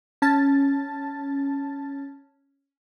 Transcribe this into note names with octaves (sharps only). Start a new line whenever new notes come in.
C#4 A5 A6